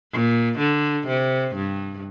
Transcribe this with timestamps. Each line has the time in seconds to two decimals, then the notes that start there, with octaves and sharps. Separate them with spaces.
0.13 A#2
0.59 D3
1.08 C3
1.56 G2